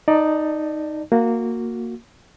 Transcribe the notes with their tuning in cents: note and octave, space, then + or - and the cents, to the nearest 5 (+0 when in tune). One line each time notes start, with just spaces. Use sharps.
D#4 +0 D5 +20 A5 +15
A#3 -10 F#4 -15